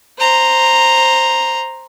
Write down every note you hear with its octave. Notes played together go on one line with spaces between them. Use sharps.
C5 A#5